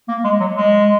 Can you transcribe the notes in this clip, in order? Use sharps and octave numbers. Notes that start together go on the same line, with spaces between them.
A#3
G#3
F#3
G#3